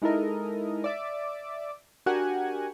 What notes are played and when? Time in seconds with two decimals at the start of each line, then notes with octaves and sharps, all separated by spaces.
0.02 G#3 D#4 E4 A4 A#4 D#5
0.84 D5 E5 D6
2.06 D4 F#4 G4 A#4 F#5 G#5